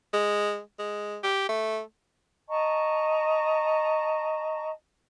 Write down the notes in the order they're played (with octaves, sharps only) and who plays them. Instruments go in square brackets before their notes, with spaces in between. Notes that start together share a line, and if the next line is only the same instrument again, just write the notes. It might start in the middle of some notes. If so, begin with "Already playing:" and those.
[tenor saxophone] G#3
G#3
G4
A3
[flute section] D#5 A5 A#5 C#6